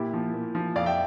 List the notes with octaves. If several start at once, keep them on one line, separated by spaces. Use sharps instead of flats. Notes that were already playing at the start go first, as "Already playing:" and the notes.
Already playing: A#2 E4 G4
F3
A#2
F3
F2 D5 F5
E5 G5